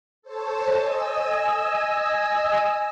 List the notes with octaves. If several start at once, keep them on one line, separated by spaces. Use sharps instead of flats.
A4 C5 C#5 A5
D#5 G#5 E6